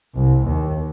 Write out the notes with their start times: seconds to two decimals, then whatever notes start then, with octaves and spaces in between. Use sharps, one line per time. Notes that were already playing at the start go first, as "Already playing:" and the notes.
0.15 C2
0.47 D#2